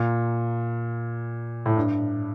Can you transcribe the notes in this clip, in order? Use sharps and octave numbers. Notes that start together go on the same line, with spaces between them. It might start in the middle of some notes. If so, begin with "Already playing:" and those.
Already playing: A#2
A2
G2